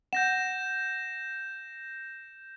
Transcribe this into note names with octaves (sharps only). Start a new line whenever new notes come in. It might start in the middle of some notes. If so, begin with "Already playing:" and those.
F#5 G6 A#6 E7